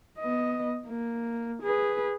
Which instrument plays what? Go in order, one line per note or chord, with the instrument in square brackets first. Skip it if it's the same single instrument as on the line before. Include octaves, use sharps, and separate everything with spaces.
[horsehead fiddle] B3 D#5
A#3
G#4 B4